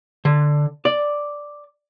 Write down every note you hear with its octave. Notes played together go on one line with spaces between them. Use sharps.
D3
D5